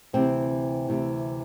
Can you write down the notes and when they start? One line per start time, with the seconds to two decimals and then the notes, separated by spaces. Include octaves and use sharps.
0.13 D2 C3 E3 C4
0.88 D2 C3 E3